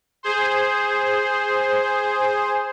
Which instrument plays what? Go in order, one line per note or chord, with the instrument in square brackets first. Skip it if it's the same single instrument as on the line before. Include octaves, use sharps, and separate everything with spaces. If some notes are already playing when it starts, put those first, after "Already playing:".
[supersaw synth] G#4 C5